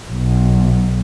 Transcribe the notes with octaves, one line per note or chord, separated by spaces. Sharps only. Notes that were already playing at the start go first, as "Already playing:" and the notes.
B1